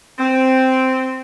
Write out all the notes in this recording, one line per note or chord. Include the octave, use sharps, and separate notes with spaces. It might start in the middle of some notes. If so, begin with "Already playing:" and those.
C4